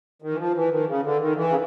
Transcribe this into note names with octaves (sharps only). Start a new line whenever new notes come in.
D#3
E3
F3
E3
D#3
C#3
D3
D#3
E3
C#3